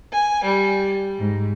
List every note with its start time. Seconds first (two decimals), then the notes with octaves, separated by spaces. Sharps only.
0.12 G#5
0.44 G3
1.18 G#2